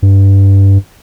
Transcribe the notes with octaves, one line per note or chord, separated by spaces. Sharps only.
G2